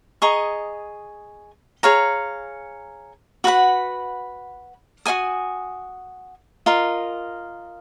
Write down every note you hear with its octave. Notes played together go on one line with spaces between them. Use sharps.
G#4 D#5 A#5 C#6
G#4 C#5 F5 A#5
F#4 B4 F#5 B5
F#4 C#5 G#5 D#6
F4 A#4 D#5